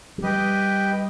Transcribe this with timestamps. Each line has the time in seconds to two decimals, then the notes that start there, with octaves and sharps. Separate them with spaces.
0.18 F#3
0.22 G3 G4 B4 D#5 G5